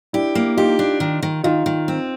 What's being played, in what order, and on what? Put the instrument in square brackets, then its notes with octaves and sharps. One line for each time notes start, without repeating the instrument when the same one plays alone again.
[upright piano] D4 E4 [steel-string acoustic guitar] G4
[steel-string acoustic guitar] A#3
[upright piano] D#4 F4 [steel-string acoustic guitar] G4
[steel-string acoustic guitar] D4
D#3
D#3
[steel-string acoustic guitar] D#3 [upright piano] D#4 F4
[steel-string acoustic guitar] D#3
C4